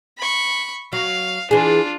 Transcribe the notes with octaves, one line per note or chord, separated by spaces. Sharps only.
B5 C#6
F#3 F5
E3 D4 F4 G#4